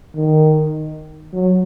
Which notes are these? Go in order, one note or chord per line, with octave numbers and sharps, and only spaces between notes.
D#3
F#3